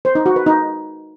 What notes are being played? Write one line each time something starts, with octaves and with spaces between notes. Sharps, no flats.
C5
D#4
F#4
B4
D#4